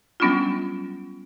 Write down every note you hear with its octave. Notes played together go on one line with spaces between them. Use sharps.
F#3 G3 B3 C#4 D4 F4